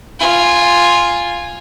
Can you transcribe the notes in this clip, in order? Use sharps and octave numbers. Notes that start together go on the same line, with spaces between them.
F4 G#5